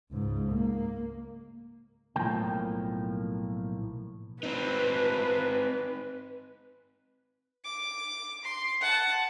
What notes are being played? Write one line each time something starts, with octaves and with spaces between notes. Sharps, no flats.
C#2 G#2
A#3
B1 A2 F3 A#3 G5
C4 D#4 B4
D6
C6
F#5 A5